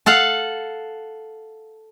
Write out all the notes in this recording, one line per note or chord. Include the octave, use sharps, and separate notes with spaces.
A4 F5 F#5 A5